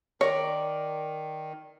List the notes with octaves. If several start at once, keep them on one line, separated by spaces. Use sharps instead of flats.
D#3 A#4 C#5 D5